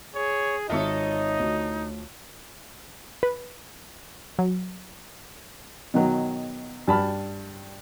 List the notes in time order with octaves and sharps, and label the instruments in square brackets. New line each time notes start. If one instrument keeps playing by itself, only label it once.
[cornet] G#4 [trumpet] C#5
[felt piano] G#1 E5 [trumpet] D#4 [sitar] F4 A4 C#5 [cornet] D#5
[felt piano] D2
[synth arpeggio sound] B4
F#3
[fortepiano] B2 D#3 F#3
G2 A5 B5 F6